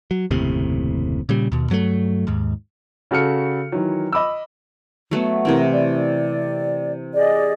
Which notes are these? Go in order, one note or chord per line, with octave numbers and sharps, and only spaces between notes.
F#3
F#1 D#2 A2 C3
A#2 C#3 G3
D#2 B2
G2 F#3 G#3 A3
D#2 G#2
C#3 F#4 A4 F6 C#7
D#3 E3 F#3
D#5 B5 D6 E6
F#3 A3 B3
C3 E3 C4 A#4
D5
G#4 D5 D#5